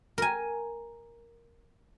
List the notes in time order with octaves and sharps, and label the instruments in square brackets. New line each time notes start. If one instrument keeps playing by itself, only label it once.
[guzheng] A#4 G#5